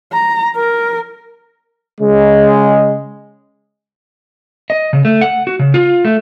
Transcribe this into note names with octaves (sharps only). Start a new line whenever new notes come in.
A#5
A#4
C#3 G#3
D#5
C#3
A3
F#5
F#4
C#3
F4
A3